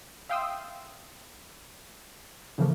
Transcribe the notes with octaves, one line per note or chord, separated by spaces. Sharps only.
E5 F5 G5 C6 D#6 E6
A2 C#3 E3 F3 A3 A#3